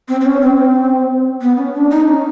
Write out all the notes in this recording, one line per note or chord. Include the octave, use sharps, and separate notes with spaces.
C4
C4
C#4
C4
B3
C#4
D4
D#4
C#4